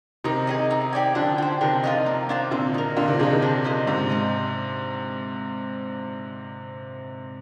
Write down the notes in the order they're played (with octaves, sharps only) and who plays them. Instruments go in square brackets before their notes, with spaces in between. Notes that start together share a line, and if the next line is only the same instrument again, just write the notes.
[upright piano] C3 D#3 [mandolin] D#4
[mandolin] G#4 C5 D#5
D#4
G4 D5 G#5
[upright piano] D3 F3 [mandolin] D4
[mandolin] G4 C5
[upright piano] C3 D#3 [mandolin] D4
[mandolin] F4 A#4 D#5
A#3
D4 F4 C5
[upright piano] A#2 D3 [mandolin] C4
[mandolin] D#4 A#4
[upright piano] A#2 D3 [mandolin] F4
[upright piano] C3 D#3
[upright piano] D3 F3 [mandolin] G#4 D#5 G5
[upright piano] C3 D#3
[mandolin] D4
G4 C5 D#5
[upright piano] G#2 C3 [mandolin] F4
[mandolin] C5 D#5